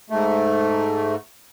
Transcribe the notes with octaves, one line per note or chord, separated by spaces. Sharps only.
G#2 A3